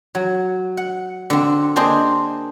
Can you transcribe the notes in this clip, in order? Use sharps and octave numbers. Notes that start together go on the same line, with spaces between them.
F#3
F#5
D3 C4
A#3 C4 D4 G#4 C5 D#5